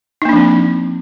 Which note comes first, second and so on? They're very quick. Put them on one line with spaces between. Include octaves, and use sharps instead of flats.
D#4 A#3 D4 F3 C4